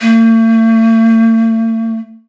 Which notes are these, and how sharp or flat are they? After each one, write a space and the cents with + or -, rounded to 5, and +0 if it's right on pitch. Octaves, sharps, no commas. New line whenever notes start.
A3 +45